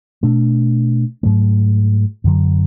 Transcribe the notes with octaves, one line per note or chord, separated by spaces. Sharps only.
B2 A3 D4
G#2 F#3 A3
F#2 D3 F#3